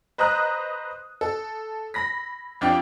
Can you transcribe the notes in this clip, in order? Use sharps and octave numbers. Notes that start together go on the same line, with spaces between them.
B4 C5 D#5 A#5 D#6 F#6
A4
B5 A#6 B6
F2 D4 F4 G4 D5 G5